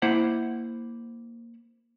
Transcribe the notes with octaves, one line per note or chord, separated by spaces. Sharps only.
A#3 E4 C5 F#5